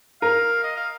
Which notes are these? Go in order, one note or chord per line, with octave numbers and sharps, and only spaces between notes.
A#4 F5
D#5
F5